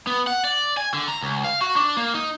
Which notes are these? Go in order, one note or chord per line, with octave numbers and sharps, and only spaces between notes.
B3
F#5
D5
G#5
D3
A#5
C#2
F5
F#4
D4
A#3
D#4